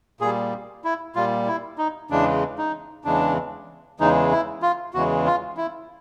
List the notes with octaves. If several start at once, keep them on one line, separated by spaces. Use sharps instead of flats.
A#2 G3 G#4
E4
A#2 G3 F4
E4
D#4
E2 C#3 E3 G#3 D4
D#4
E2 C#3 E3 G#3 D4
E2 C#3 E3 G#3 D#4
E4
F4
E2 C#3 E3 G#3 F#4
F4
E4